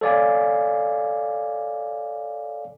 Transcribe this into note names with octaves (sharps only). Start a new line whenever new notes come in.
A4 C#5 D5 F5 G#5